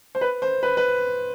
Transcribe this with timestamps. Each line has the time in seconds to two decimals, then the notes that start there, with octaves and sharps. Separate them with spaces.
0.15 C5
0.21 B4
0.42 C5
0.63 B4
0.77 B4